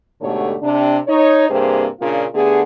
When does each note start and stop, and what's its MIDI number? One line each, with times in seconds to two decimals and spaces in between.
0.21 0.55 44
0.21 0.55 47
0.21 0.55 50
0.21 0.55 57
0.21 0.55 67
0.21 0.55 73
0.62 0.97 48
0.62 0.97 62
1.08 1.47 63
1.08 1.47 73
1.49 1.87 43
1.49 1.87 48
1.49 1.87 58
1.49 1.87 60
1.49 1.87 68
1.49 1.87 72
2.00 2.24 46
2.00 2.24 49
2.00 2.24 58
2.00 2.24 62
2.00 2.24 65
2.33 2.62 50
2.33 2.62 57
2.33 2.62 59
2.33 2.62 67
2.33 2.62 68